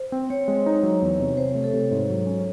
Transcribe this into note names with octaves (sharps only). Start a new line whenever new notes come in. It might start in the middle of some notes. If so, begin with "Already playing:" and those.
Already playing: C5
C4 C5
C4 C#5
G#3
D#4
F#3
E2
C3
C3 C5
A3
A4
C3
G#2 C#5
F#3
C#4